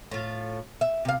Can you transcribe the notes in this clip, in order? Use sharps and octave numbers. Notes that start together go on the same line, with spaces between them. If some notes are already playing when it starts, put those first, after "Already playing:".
A2 F4
E5
C3 F5